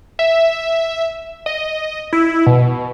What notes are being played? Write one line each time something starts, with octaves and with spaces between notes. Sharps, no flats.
E5
D#5
E4
B2